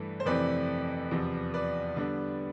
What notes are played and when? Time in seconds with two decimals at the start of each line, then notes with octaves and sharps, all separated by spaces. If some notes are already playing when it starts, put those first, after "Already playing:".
Already playing: G2 E3 A3
0.20 C5
0.26 F2 C3 E3 A3 C4 B4 D5
1.11 E2 C3 F3
1.54 B4 D5
1.96 D3 G3 B3 D4